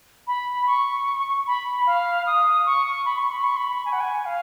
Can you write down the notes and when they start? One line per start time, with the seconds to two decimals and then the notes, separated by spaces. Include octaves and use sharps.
0.27 B5
0.67 C#6
1.47 B5
1.86 F5
2.26 D#6
2.66 C#6
3.05 B5
3.18 C#6
3.31 B5
3.44 C#6
3.57 B5
3.85 G#5
3.92 F#5
4.00 G#5
4.25 F5